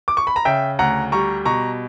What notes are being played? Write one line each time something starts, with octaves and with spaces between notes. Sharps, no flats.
D6
C#6
B5
A#5
C#3 E5 G5
D2 F#5 A#5
G3 A#5 C#6
B2 A#5 C#6